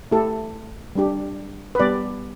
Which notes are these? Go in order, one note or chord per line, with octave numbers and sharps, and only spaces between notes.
A3 E4 G4 A4
G3 D4 G4
B4
G3 B3 G4 D5